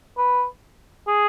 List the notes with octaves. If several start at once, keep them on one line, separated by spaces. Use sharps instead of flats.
B4
G#4